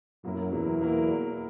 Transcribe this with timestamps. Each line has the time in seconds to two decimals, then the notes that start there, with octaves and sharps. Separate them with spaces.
0.24 F#2 B2 F#3 A#3 E4 A#4
0.53 E2 B2 F#3 A#3 E4 A#4
0.81 B2 F#3 A#3 E4 A#4